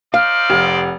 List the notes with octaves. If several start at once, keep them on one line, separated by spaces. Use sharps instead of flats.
D#4 C5 D5 F5 F6
F1